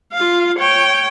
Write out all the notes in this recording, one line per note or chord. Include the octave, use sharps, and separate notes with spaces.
F4 F5
C#5 G5